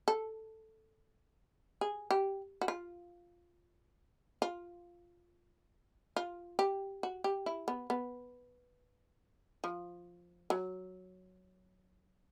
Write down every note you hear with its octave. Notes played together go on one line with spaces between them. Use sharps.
A4
G#4
G4
F#4
F4
F4
F4
G4
F#4
G4
E4
B3
B3
F3
F#3